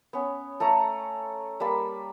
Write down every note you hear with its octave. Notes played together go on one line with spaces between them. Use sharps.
B3 C#4
A3 A4 C#5 A#5
G3 A#3 A5 B5